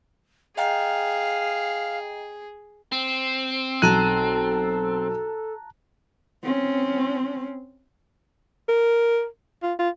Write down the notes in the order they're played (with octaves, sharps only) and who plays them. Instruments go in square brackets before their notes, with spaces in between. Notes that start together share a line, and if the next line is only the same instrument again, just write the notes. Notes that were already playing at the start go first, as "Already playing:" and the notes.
[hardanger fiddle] G#4 [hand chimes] D#5 G5 A#5 [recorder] F5
[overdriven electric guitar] C4
[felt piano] B1 D#7 [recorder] A4 [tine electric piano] A5 A#5 F#6
[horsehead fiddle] C4 C#4
[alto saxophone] A#4
F4
F4